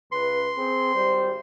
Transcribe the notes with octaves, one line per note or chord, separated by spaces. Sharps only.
C#2 B4 C6
C4 G#4
G#1 G3 C5